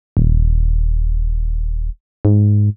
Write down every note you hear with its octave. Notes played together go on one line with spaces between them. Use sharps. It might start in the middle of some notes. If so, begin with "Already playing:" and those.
D#1
G#2